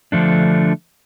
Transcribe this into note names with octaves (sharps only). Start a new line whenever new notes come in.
D3 F3 A3 D4